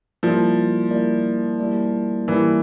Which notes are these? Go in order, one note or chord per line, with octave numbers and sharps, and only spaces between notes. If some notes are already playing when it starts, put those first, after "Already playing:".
F3 G3 A#3 E4 A#4 D5
G3 A#3 E4 A#4 D5
G3 A#3 E4 A#4 D5
E3 G3 A#3 E4 A#4 D5